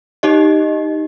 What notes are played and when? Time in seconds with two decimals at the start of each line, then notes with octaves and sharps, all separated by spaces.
0.23 D#4 G4 D#5